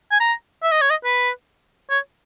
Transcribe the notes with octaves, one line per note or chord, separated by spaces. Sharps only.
G#5
A#5
E5
D#5
C#5
D#5
B4
C#5